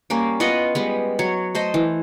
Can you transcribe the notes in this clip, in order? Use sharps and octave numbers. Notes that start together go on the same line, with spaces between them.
G3 A#3 C#4
B3 F4 D#5 F#5
G3 G#3 B3
F#3 C#5
A3 C5 D#5
E3